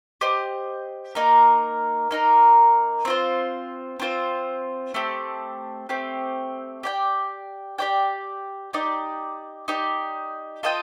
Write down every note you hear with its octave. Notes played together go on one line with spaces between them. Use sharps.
G4 C5 D#5
A#3 D#4 A#4
A#3 D#4 A#4
C4 F4 C5
C4 F4 C5
A3 C4 G4
A3 C4 G4
G4 D5 G5
G4 D5 G5
D#4 G4 D5
D#4 G4 D5
F4 A4 D#5 G5